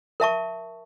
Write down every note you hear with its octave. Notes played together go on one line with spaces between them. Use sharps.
A#4 E5 A5 C#6